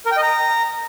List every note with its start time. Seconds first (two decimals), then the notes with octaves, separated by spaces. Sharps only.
0.06 A#4
0.11 G5
0.17 D#5
0.22 A#5